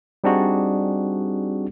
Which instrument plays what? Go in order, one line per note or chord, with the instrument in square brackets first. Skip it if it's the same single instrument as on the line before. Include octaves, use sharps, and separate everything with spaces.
[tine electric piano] G3 C4 D4 D#4 F#4 G#4